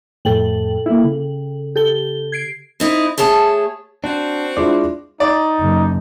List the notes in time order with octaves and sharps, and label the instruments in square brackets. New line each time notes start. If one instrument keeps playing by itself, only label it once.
[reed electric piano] F2 A2 [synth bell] A4 G5 F#7
[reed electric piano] A#3 E4
C#3
[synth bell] G4 A4 G7
G#6 C7 D7
[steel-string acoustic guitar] C4 D#4 E4
A3 G#4 C#5 A5
[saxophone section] C4 F#4 [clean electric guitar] D4
[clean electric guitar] G#3 D5 [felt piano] D4 E4 F4
[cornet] D#4 [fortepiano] D5
[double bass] F#1